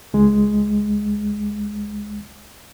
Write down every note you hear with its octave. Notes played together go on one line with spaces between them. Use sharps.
C#2 G#3